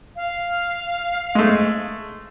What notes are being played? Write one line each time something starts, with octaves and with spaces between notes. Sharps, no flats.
F5
G#3 A3